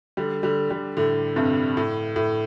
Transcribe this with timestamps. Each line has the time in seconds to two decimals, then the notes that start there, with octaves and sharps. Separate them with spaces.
0.17 D3 G3
0.43 D3 G3
0.70 D3 G3
0.97 A2 D3
1.36 G2 C3
1.77 A2
2.16 A2